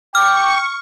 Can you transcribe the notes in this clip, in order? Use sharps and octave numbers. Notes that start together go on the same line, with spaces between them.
G5 C#6 D6 F6